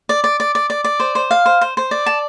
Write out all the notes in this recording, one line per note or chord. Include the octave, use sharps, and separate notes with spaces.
D5
D5
D5
D5
D5
D5
C5
C5
F5
C5
C5
C5
D5
A5